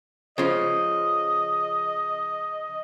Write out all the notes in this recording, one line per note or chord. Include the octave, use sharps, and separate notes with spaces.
C#3 F3 D#5